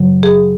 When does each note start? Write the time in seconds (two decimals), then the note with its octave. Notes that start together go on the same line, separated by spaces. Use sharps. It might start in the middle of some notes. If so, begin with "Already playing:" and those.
Already playing: F#2 C#3 F#3
0.23 G#4